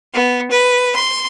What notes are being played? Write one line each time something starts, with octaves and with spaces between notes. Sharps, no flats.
B3
B4
C6